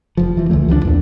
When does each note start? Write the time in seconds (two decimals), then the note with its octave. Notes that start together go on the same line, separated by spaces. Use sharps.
0.17 F1 F3
0.37 E3 F3
0.50 C#2 D3 E3 A3
0.68 C#2 F3 F#3 D4
0.85 E2 A#2